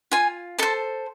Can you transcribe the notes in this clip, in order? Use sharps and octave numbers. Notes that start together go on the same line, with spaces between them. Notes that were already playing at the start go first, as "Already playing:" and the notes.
F4 G#5
A4 C5 A5